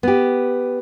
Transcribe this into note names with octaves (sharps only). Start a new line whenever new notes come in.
B3 G4